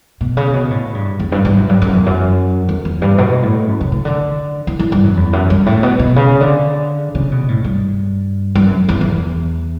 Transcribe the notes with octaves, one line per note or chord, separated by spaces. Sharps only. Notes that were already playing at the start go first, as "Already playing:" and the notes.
B2
C#3
B2
A2
G2
E2
G2
G2
F#2
G2
F#2
E2
F#2
E2
E2
G2
B2
A2
F#2
C#3
C#3
D3
E3
E3
G2
F#2
E2
F#2
G2
A2
B2
B2
C#3
D3
C#3
B2
A2
G2
G2
F#2
E2
E2